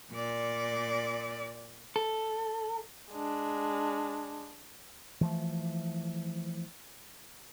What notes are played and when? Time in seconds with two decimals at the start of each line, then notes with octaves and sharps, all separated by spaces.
0.12 A#2 D5
1.96 A4
3.12 G#3 D4
5.21 E3 F3 A3